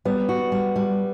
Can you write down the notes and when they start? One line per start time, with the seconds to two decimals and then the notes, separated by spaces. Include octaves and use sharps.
0.05 G3 B3
0.29 F#4
0.52 G3
0.76 G3